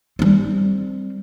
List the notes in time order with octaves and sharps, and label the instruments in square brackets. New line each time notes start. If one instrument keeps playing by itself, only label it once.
[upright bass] G3 C4